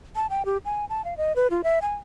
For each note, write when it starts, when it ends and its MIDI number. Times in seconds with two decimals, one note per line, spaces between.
0.16 0.27 81
0.30 0.45 79
0.45 0.58 67
0.65 0.85 80
0.90 1.04 81
1.05 1.14 77
1.17 1.35 75
1.36 1.47 71
1.50 1.62 65
1.64 1.79 76
1.82 1.95 80